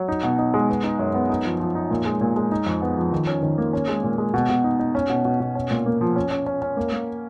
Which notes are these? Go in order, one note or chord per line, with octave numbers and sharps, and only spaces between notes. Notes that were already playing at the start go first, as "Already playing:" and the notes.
Already playing: F#3
D#4
B2
D#4
G#3
B3
D#4
F#2
B3
D#4
F3
F3
D#4
A#2
G#3
A#2
G#3
D#4
F2
B3
F3
D#3
C#4
D#3
A#3
C#4
G#3
A#2
G#3
B2
B2
D#4
D#4
C#4
B2
B2
B2
C#4
A#2
A#3
F3
C#4
C#4
C#4
C#4
A#3
A#3